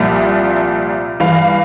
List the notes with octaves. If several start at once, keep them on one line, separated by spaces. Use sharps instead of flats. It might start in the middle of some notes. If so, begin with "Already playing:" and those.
Already playing: C2 A#2 F3 E5
G2 E3 F5